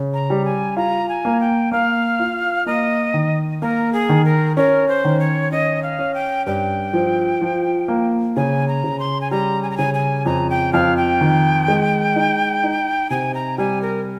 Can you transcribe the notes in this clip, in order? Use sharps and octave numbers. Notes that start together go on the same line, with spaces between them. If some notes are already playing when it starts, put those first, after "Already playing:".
Already playing: C#3
A#5
G3
G#5
F4 A#5
G#5
A#3
G5
A#3 F5
F4
A#3 D#5
D#3
A#3 A#4
G#4
D#3
A#4
C#4 A#4
C5
D#3
C#5
C#4 D#5
F5
C#4
G5
G2 G5
F3
F3
A#3
C#3 G#5
A#5
C#3
C6
G#5
G3 A#5
G#5
A#5
C#3 G#5
G#5
F2 A#5
G5
F2 F5
G5
D#3
G#3
D#4
D#4
C3 G#5
A#5
G3 G#5
A#4